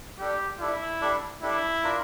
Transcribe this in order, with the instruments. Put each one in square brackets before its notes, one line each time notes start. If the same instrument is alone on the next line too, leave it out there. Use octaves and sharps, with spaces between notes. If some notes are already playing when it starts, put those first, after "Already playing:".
[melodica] G3 D4 A4 D5 [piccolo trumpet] G4
[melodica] G3 D4 A4 D5 [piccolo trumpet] E4
[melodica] G3 D4 A4 D5
[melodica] G3 D4 A4 D5 [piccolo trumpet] E4
[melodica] D4 F4 A#4